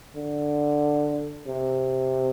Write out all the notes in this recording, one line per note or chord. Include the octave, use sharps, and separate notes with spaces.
D3
C3